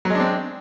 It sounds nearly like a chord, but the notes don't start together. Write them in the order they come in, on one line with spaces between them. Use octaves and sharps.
F#3 G#3 D4 C4